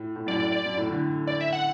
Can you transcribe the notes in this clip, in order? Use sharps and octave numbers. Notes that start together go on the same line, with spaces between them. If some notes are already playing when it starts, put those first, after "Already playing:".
Already playing: A2
A2
F#2 D5
A2
D5
D5
F#2
A2
A2 D3
D5
E5
F#5